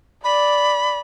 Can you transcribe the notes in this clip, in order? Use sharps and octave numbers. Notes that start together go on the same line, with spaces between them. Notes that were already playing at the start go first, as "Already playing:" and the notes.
D5 B5